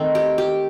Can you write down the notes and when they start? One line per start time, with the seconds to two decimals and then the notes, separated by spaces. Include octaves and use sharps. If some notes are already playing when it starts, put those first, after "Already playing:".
Already playing: D#3 A3 C4
0.15 G4
0.38 G4